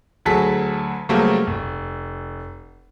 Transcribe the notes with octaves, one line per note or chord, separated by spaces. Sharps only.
D2 F#3 G#4 A4 A5 B6
C#3 F#3 G3 A3 A#3 C4
F1